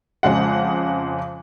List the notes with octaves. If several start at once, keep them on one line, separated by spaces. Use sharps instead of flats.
F2 C#3 G#3 F#5